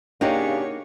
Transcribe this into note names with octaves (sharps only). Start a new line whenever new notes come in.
C#3 A#3 D4 D#4 F#4 G4 C#5